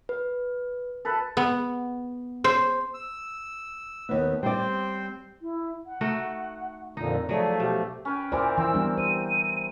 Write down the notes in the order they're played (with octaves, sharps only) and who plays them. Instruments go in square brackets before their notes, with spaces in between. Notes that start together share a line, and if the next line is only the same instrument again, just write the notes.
[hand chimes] B4
[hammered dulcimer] A4 B4
[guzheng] B3
C5
[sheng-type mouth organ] E6
[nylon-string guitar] D#2 B3
[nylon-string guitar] G3 D5 [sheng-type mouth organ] C4 C5 G5
[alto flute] E4
F#5
[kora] A3 D#4 F#4
[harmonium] F2 A#2 D3 [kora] D#4
[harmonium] F3 A3 [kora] F#3 G#4 [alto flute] D5
[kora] B2 [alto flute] G4
[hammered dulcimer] C#4 B4 G5
[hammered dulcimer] A#2 E3 A#4 [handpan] C5 D5
[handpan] E3 [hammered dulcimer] C4 E4 [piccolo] E6
[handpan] G3 B3 D4
[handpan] C5 [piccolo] D#7